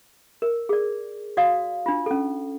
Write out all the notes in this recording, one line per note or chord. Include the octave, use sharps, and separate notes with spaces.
A#4
G#4 D5
F#4 D5 F5 D#6
D4 F4
C#4 A4